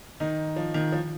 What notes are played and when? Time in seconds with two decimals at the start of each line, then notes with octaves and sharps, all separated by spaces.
0.20 D#3 D#4
0.56 F3
0.74 D#3
0.92 F3